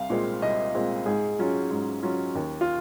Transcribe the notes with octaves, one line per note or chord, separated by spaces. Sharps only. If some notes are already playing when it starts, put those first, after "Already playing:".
Already playing: C2 F5
A#2 G#3 C4
C2 D#5
A#2 G#3 C4
G#2 G#4
F#3 C#4 F4
G#2
F#3 C#4 F4
D#2
F4